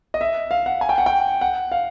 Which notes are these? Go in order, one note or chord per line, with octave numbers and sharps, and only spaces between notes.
D#5
E5
F5
F#5
G#5
G5
F#5
G5
F#5
F5